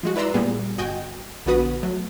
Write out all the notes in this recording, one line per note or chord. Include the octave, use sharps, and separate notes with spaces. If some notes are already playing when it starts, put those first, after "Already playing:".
F3 G#3 F#4
E4 B4 D5 A#5 C6 E6
A#2 G3 B3 G#4
G1 F#4 D#5 G5 G#5
A#1 D3 B3 F#4 B4 D#6
F#3 A3